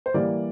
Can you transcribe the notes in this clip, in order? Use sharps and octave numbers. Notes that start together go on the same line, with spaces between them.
C5
E3 G3 A#3 D5